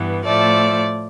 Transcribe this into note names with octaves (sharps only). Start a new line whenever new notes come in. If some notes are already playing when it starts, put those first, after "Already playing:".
Already playing: G2 E3 B3
A2 F3 A3 D5